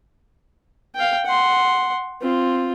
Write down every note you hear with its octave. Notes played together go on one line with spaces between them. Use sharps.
F5 G5
F#5 C6
C4 F4